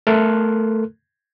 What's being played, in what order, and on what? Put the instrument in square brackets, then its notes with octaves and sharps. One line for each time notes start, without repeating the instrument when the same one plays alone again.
[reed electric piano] A3 A4 A#4 C6 F6 F#6